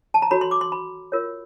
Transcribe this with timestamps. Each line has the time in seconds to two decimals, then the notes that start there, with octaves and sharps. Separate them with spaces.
0.14 A5
0.22 A#5
0.31 F#4 A4 C#5 B5
0.41 C6
0.51 D6
0.61 C6
0.72 B5
1.12 F4 A#4 C#5